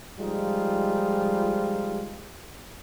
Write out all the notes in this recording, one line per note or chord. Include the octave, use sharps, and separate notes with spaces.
F3 G3 G#3 D#4 F4